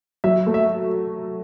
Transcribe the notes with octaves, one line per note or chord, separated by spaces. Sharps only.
F#3 E5
A3
E5